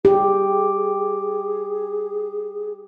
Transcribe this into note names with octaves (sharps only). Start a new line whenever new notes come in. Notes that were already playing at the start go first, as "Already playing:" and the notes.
G4 G#4